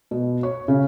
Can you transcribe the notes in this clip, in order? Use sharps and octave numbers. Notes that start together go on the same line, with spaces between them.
B2
C#5
C#3